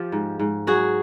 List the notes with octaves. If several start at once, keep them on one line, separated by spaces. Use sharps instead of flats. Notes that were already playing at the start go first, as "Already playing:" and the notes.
Already playing: F3 F4 G4
G#2
G#2
F#3 F#4 G#4